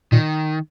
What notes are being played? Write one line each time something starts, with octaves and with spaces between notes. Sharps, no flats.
A#2 D#3